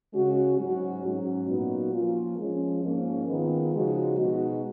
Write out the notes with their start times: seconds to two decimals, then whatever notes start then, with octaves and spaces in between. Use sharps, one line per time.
0.13 C#3 G#3 C#4 F#4
0.57 G#2 F#3 C#4 F#4
1.03 G#2 F#3 C#4
1.47 A#2 F#3 B3 D#4 F#4
1.92 F3 A#3 C#4 F4
2.37 F3 G#3 C#4
2.82 G#2 F3 A#3 C#4
3.27 D#3 G#3 B3 F4
3.72 C#3 F3 G#3 D#4 F#4
4.17 B2 G#3 D#4 F#4